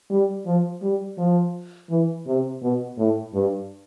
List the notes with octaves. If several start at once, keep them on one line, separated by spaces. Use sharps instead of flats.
G3
F3
G3
F3
E3
C3
B2
A2
G2